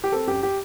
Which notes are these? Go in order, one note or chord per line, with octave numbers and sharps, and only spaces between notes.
G4
C4 A4
F#2 G4
G4